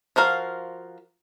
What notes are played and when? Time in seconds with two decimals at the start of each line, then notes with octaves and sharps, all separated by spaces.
0.16 F3 F#4 A#4 F5